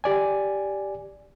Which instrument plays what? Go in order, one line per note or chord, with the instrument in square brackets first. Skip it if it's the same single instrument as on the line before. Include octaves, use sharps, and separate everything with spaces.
[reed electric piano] G4 D5 G#5